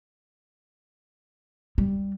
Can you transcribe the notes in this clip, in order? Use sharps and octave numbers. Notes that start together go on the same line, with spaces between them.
G3